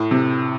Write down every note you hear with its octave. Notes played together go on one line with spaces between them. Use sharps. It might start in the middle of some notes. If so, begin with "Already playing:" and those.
Already playing: A2
C3